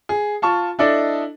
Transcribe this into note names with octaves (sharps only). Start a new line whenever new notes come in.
G#4
F4 A5 C#6
D4 E4 A4 D5 D#5